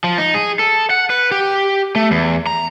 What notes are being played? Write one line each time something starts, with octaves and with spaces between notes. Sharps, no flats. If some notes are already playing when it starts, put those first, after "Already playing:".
F3
D#4
G#4
A4
F#5
B4
G4
A3
E2
A#5